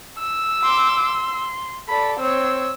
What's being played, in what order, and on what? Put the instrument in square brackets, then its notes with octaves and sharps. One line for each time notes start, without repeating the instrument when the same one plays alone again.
[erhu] E6
[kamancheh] C6 D6
C6
[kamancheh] A4 D5 [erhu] B5
[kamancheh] C4 C#5 [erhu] E6